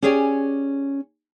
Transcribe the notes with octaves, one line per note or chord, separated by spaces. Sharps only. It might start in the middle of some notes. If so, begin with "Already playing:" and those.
C#4 G4 G#4 C#5 D5